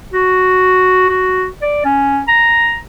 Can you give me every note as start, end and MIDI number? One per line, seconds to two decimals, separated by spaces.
0.14 1.06 66
1.09 1.48 66
1.62 1.80 74
1.85 2.22 61
2.28 2.78 82